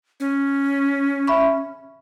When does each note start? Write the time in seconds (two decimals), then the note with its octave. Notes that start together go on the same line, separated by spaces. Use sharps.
0.20 C#4
1.27 E5 B5 C#6